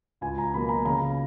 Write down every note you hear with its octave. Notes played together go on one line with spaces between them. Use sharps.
C#2 G#5
A#5
B2 F#3 A#3 B5
A#5
C#3 A#5